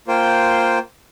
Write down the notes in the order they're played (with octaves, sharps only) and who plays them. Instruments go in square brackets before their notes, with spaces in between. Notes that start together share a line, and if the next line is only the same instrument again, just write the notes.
[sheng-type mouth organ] A#3 F4 C5 G5